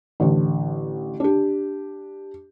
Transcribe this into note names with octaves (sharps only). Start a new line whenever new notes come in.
A1 D3
D4 G4